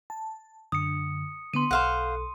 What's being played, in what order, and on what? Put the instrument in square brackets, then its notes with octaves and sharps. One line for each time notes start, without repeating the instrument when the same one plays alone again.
[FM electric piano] A5
[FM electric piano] F#2 D3 [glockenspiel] D#6 C#7
[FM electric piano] D3 B3 [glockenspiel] C6 D#7
[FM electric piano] B1 A4 [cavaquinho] C5 F5 F#5